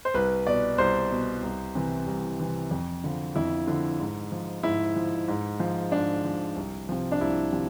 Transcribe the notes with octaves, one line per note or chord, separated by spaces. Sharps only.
C5
C2 B4
B2 D5
C2 C5
B2
C2
C3 E3
C2
C3 E3
F2
D3 F3
F2 E4
D3 F3
G#2
F3
G#2 E4
F3
G#2
F3
G#2 D4
F3
C2
C3 F3
D4
C2 E4
C3 F3